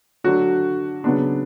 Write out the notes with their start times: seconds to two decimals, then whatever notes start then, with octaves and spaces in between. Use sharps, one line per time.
0.24 D3 F#3 A3 D4 F#4
1.04 C#3 F#3 B3 D4